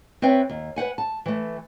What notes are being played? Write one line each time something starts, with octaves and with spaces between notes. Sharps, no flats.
C4 B4 C#5 E5 G5
D#2
B4 C5 F#5 G#5
A5
E3 A3